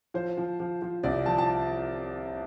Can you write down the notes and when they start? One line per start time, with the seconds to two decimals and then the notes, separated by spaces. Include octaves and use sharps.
0.14 F3 C5
0.37 F3
0.60 F3
0.82 F3
1.03 C2 D5
1.26 F3 A5
1.38 A5